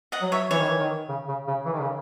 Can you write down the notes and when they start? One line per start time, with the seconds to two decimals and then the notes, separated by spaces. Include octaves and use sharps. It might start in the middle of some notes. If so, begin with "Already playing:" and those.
0.12 D#5 F#5
0.22 F#3
0.32 C#5 E5
0.51 E3 C#5
0.59 D#3
0.69 E3
0.80 D#3
1.09 C#3
1.28 C#3
1.47 C#3
1.66 E3
1.73 D#3
1.81 C#3